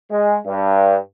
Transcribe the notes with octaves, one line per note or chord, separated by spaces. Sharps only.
G#3
G2